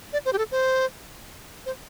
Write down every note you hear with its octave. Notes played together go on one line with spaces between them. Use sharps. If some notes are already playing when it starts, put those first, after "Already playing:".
D5
C5
G4
A4
C5
C5